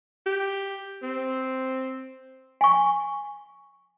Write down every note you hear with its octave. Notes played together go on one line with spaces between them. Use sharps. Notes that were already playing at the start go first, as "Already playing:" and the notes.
G4
C4
G#5 C#6